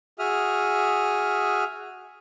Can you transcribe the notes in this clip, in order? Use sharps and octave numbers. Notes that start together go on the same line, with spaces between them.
F#4 G#4 E5 D#6 F6